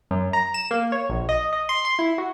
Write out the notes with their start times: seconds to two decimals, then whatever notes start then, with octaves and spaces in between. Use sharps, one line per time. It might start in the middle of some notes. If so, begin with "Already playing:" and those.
0.11 F#2
0.33 A#5
0.54 E7
0.71 A#3
0.92 C#5
1.10 A#1
1.29 D#5
1.53 D#5
1.69 C6
1.85 C6
1.99 E4
2.18 F#4